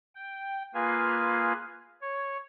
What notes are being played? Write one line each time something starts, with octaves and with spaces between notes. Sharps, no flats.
G5
A#3 F4 G#4 B4 F5 G#5
C#5